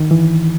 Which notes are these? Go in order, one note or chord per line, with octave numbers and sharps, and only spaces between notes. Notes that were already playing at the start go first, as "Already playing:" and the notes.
Already playing: D#3
E3